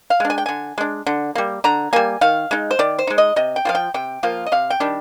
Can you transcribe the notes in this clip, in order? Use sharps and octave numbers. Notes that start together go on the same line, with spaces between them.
F5
G#3 D4
G#5
G5
D3 G#5
G#3 D4
D3
G3 A#3
D3 A#5
G3 A#3 G#5
D#3 F5
G#3 D#4
C5
D#3 D5
C5
G#3 D#4
D#5
C3 D#5
G5
F3 A#3 F4 F5
G5
C3 G5
F3 A#3 F4
D#5
C3 F5
G5
D#3 G3 D4